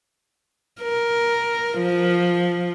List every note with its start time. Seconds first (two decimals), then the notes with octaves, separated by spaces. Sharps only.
0.82 A#4
1.80 F3